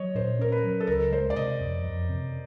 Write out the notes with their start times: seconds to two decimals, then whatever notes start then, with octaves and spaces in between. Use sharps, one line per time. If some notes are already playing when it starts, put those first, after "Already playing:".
Already playing: F#3 C#5 D#5
0.15 A#2 C5
0.39 C#4 A#4
0.52 B4
0.63 F#3
0.80 A4
0.87 C#2 A#4
1.12 G#3 C5
1.30 D5
1.36 C3 D#5
1.60 F2
1.85 F2
2.09 C3